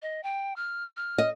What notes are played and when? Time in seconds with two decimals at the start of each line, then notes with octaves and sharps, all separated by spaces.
0.02 D#5
0.23 G5
0.56 F6
0.97 F6
1.18 D#5